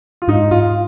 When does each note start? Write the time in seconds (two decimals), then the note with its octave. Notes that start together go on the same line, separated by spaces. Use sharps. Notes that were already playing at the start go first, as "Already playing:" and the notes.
0.22 F4
0.28 G#2 D#4
0.51 G#2 F4